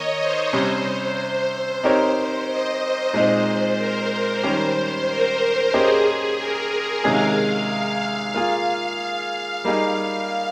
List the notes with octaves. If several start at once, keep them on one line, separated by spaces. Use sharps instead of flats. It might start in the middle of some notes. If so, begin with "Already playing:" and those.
Already playing: D#3 A#3 C#5 D#5
C5
C3 G3 C#4 C5
C4 D#4 G4 A#4 C#5
D#5
A#2 G#3 C4 D#4 C5
A#4
D#3 G3 C#4 G4 C5
A#4
A#3 C#4 G4 G#4 C5 D#5
G#4
A#4
C3 D#3 G#3 C#4 G#4 F5
F5
A#3 F4 G#4
G3 A#3 D#4 G#4